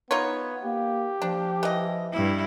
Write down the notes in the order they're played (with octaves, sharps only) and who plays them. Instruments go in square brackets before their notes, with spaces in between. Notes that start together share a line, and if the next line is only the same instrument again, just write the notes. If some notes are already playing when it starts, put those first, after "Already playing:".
[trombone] B3 [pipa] D#4 F4 C#5
[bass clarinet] A#3 [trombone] G4
[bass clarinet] F3 [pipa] D4
[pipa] E3 D#5
[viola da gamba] G2 E4